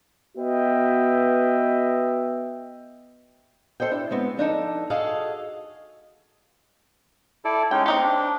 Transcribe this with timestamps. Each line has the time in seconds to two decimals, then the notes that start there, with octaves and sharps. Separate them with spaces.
0.38 B3 F#4 B4 D#5 E5 G5
3.80 A4 C5 D#5 G5
3.91 D4 E4
4.11 G#3 B3 C4
4.37 F3 D4 D#4 A4
4.90 F#4 G#4 A4 D#5 F5
7.45 E4 A4 D5
7.71 G#3 C#4 D#4 G5
7.86 C4 D#4 G4 C#6
8.03 D4